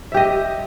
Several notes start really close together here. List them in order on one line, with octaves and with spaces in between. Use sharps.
E5 G4 D#5